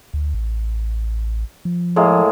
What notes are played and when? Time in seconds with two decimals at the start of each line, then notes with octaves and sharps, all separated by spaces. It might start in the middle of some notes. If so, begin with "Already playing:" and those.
0.14 D2
0.34 A1
1.65 F3
1.96 A2 G#3 A#3